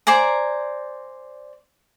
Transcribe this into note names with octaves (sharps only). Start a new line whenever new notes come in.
C5 D5 G#5 A#5